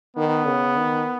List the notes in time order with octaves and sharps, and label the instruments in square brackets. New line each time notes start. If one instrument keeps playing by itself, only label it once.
[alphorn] D#3 [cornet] B3
[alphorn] C#3
D#3